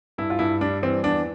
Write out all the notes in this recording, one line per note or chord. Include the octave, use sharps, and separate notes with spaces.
G2 E4
F4
G2 E4
G3 D4
E3 C4
E2 D4